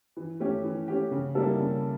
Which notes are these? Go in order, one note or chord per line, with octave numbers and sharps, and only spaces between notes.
E3
A3 C#4 G4
E3
A3 C#4 G4
C#3
G3 A#3 E4 A4
C#3